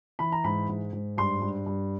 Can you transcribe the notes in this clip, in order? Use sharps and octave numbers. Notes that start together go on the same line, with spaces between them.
E3 B5
A#5
G#2 B5
G#2
G#2
G2 C6
G2
G2